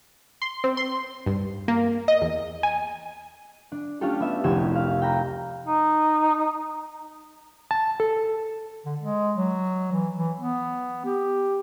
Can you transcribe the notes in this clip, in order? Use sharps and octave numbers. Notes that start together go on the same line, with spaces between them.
C6
C4
C6
G2
A#3
D#5
E2
G#5
D4
A3 C#4 D4 F4 G4 A4
B3 E5 E6
F1 C2 G4 G#6 D#7 E7
F5
G5 A#5 B5 F#6
D#4
A5
A4
D3
G#3
F#3
E3
E3
B3
G4